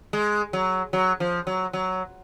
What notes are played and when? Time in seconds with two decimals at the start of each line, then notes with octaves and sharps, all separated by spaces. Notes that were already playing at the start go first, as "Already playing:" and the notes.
0.13 G#3
0.53 F#3
0.93 F#3
1.20 F3
1.47 F#3
1.73 F#3